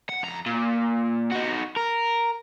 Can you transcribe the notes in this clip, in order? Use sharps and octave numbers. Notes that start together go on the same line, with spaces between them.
F#5
F2 A#5
A#2
D#4 F#4
A#4